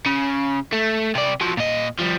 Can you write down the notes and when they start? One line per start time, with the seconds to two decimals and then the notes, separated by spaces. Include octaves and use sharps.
0.06 C#3
0.73 A3
1.15 C3 D5
1.41 F3 F#3
1.57 A#2 D#5
1.99 F3 G3